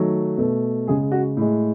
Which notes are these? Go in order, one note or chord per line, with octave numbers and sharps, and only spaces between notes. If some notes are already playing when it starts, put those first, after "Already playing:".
Already playing: D#3 F#3 A3
B2 A3
C#3 G#3 G#4
F#4
A2 G#3